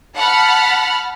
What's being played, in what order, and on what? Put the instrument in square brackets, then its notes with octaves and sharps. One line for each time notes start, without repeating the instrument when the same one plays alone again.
[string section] F#5 A5 B5 F6